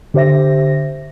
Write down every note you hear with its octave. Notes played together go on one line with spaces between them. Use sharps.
D3 G4 C5 E5 A#6